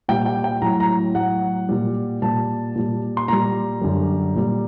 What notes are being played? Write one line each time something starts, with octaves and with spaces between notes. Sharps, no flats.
A#2 G3 G5
G5
G5
A2 F#3 A#5
A#5
A2 F#3 F#5
A#2 G3
A#2 G3 A5
A#2 G3
C6
A#2 G3 A#5
F#2 D3 G3
A#2 G3